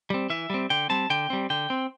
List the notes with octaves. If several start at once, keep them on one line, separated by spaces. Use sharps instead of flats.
G3 C4
E3 E5
G3 C4
D3 G5
G3 C4 A5
D3 G5
G3 C4
D3 G5
C4